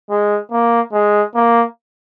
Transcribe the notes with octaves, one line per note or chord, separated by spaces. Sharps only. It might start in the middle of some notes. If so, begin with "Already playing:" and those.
G#3
A#3
G#3
A#3